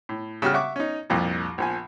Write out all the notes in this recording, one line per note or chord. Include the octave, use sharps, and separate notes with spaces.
A2
C#3 G3 F#4 F6
E5 F#5 C#6 D6
C#4 D#4
C2 F2 A#2
A#1 F3 G#5